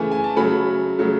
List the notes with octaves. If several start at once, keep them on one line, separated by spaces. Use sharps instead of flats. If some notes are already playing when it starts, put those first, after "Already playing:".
Already playing: C#3 E3 A3 G#5
G#5
A5
C#3 F#3 A3 B5
C#3 F#3 A3